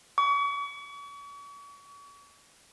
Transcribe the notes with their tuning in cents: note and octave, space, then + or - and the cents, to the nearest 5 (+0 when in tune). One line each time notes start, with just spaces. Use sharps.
C#6 +40